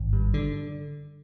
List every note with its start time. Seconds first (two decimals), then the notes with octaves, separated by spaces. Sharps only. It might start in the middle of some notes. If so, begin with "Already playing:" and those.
Already playing: G#1
0.13 G2
0.34 D3